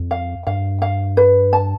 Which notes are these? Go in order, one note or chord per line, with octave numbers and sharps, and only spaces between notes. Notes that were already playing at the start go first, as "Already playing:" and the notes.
Already playing: F2
F5
G2 F5
F5
B4
A5